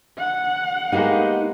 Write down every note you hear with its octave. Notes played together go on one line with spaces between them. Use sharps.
F#5
G#3 A#3 B3 D#4 G4